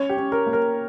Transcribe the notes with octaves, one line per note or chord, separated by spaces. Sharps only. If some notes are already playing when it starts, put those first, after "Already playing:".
Already playing: C#4 C#5
G4
C#4
A#4
A#3
A#4